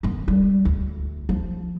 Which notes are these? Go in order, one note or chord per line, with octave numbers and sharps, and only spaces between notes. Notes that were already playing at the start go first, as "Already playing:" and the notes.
D#3 B3
G3 G#3
D2
F3